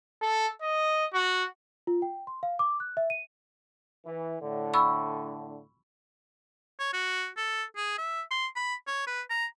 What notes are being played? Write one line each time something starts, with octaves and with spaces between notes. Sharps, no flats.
A4
D#5
F#4
F4
G5
C6
F5
D6
F#6
E5
D#7
E3
A2 D3
B5 C#6 E6
C#5
F#4
A4
G#4
E5
C6
B5
C#5
B4
A#5